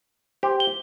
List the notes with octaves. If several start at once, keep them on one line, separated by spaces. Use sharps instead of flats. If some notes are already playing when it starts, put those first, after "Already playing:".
G4 C5
G7